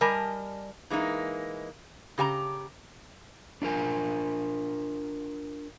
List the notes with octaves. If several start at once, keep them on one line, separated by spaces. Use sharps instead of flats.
G3 A#4 D#5 G#5 A5
E3 G#3 A#3 D#4
C#3 G4 G#5 A#5
D4 F4 A#4 G#5